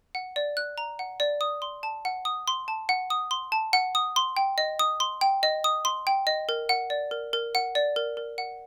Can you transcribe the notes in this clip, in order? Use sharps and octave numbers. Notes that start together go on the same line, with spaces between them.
F#5
D5
F#6
A#5
F#5
D5
D#6
C6
A5
F#5
D#6
C6
A5
F#5
D#6
C6
A5
F#5
D#6
C6
G5
D#5
D#6
C6
G5
D#5
D#6
C6
G5
D#5
A#4
F#5
D5
A#4
A#4
F#5
D5
A#4
A#4
F#5